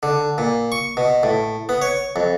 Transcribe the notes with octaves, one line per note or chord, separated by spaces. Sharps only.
D3
A#2
C#6
B2
A2
B3
C#5
F2